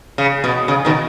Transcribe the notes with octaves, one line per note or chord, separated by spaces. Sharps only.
C#3
B2
C#3
B2 D#3